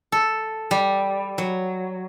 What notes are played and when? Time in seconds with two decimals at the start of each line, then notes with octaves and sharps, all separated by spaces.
0.12 A4
0.71 G3
1.38 F#3